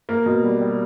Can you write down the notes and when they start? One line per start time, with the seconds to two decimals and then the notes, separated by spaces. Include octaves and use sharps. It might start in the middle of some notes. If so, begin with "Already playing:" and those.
0.09 A#3
0.26 B2
0.43 G3
0.60 G3